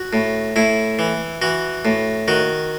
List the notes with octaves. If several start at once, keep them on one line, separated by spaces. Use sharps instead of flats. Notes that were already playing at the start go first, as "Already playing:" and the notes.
Already playing: F#4
A2
A2 E4
E3
E3 F#4
A2
D#3 F#4